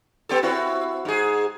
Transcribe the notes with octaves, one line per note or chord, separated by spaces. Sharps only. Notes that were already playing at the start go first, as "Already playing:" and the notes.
B3 G4 A4
C4 E4 F#4
G#2 G#4